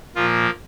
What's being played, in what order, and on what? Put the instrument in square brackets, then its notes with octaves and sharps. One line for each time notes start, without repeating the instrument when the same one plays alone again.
[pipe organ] A#2 F3 A#3 F4